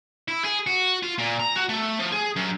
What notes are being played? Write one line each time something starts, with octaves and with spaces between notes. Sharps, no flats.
E4
G#4
F#4
F4
A#2
A#5
F#4
A3
F3
G#4
F#2